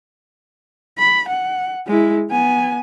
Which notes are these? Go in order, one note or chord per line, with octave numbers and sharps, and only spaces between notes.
B5
F#5
G#3 E4
B3 G#5